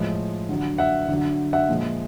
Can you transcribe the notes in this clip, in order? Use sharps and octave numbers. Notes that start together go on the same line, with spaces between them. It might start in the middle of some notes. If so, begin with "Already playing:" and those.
Already playing: A2 F3 G#3
D3 F#3
E5 F#5
D3 F#3
E5 F#5
A#2 F3 G#3